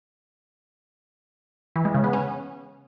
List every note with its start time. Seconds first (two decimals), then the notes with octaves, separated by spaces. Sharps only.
1.76 E3
1.85 G#3
1.94 C#3
2.04 B3
2.13 C#4